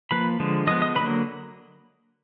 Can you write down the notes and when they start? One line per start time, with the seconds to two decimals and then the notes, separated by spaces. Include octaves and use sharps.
0.11 F3 A#3 B4 B5
0.40 D3 F3 G#3
0.67 F3 G#3 B3 D#5 D#6
0.82 D#5 D#6
0.95 D3 F#3 A#3 B4 B5